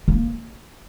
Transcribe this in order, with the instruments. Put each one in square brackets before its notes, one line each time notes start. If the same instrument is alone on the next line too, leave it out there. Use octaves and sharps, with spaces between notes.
[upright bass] A#3